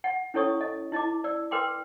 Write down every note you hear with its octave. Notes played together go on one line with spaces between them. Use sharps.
F#5
C#4 E4 A4 C#5 C#6 D#6
D#5
E4 D#5 A5 D6
D5 E6
A#4 B4 G5 C6 D6